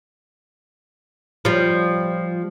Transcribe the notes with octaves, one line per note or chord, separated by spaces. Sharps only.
F3 G3